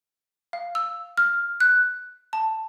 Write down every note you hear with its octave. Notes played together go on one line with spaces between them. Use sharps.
F5
E6
F6
F#6
A5